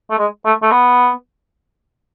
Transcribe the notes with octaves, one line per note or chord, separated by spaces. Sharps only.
A3
G#3
A3
A3
B3